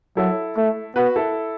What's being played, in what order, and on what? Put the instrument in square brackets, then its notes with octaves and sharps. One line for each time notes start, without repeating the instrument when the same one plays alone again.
[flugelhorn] F#3 [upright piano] E4 A4
[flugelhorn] A3
[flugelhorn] B3 [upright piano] F#4 B4
[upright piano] E4 A4